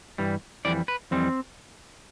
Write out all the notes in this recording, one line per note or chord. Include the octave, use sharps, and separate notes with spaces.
G2 E3 G3
F2 E3 G3 D5
B4
F2 E3 G3 C4